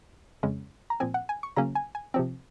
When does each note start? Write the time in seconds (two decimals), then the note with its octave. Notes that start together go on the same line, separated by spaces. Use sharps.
0.43 F2 C#3 G#3 C#4
0.90 A#5
1.00 A#2 F3 C4 G#5
1.14 F#5
1.29 G#5
1.43 C#6
1.56 C#3 F#3 A#3 C#4 A#5
1.75 G#5
1.95 G#5
2.14 C3 F3 C4